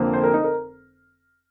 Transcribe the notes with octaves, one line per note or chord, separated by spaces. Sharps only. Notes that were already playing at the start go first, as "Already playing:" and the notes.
Already playing: F1 F2 D3 F3 A#3
C5
A#4
D#4
A#4